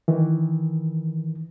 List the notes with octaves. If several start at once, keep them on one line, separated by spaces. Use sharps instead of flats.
D#3 E3